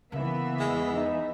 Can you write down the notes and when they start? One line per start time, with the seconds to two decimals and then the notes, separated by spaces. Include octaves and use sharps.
0.12 C#3 E3 A#3 B3 C#4 E5
0.60 E2 G#3
0.94 D#4